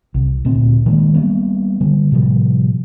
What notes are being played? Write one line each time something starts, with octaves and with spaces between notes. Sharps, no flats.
C2
D2 A#2 C4
D#3 G#3 A#3
G3 A#3 B3
D3 G3
A2 C3 F3 G3